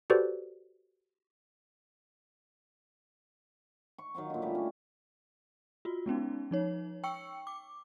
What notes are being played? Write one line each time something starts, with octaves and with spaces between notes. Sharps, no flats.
F#4 G4 A4 B4 C5 D5
C#6
D#3 F#3 F5 C#6
A#2 D3
G3 A3 G4
C#4
F4 F#4
G#3 B3 C#4 D#4
F3 D#4 C#5
G5 C#6 E6 C#7
D6